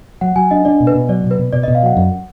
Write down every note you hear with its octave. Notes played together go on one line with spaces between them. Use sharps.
F#3 F#5
F#3 G#5
D4 D#5
D4 D5
B2
B4
B2
F#3 D5
B2
B4
B2
B2 D5
D#5
B2
F5
F#3 F#5
F#2